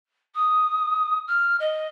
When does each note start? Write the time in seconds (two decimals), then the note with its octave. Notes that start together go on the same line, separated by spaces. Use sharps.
0.35 D#6
1.27 F6
1.59 D#5